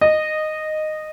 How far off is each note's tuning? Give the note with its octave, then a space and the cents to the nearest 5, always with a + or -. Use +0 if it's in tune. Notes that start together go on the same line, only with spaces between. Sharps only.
D#5 -10